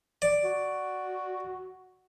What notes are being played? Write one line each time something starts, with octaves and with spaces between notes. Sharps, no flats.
D5
F#4